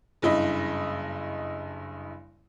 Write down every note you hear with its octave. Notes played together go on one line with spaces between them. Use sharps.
F#1 G2 E4 D#5 B5